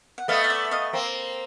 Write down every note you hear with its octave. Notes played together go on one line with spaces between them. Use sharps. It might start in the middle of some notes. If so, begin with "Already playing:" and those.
F#5
A3 B3 D#5 F5
F5
D5 E5
D#5 F5
A#3 C4